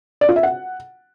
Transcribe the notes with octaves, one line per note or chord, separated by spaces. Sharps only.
D5
F4
E5
F#5